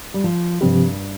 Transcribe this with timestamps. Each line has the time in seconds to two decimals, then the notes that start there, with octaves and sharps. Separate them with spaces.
0.14 G3
0.24 F3
0.61 G2 C3 F3 C4 G4